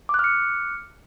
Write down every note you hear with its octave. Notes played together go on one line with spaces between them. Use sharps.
D6 F6 F#6 C#7